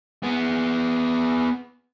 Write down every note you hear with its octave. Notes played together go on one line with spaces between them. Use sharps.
B3 G#4